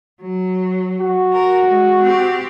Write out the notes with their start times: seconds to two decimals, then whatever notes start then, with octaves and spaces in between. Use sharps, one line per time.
0.21 F#3
1.00 F#4
1.33 A#4
1.65 G#3
2.02 C4 G4